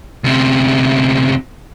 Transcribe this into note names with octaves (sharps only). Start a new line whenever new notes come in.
D2 C3